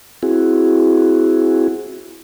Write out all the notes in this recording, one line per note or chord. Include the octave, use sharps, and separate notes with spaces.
C4 E4 F#4 G#4